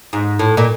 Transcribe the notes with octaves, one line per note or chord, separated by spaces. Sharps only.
G#2
A2
A#2